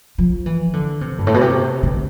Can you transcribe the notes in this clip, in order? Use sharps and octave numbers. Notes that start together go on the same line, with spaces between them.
F3
E3
D3
C3
G2
A2
B2
C3
D3